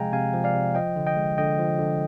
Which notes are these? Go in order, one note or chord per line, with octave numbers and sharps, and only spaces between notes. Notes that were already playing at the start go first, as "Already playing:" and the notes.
Already playing: C3 F3 G#3 F5 G5 G#5 A#5
C3 F5 G#5
F3
D5 F5
C3
F3 D#5 G5
D3
D#5 G5
G#3
D3 D#5 G5
F3
D3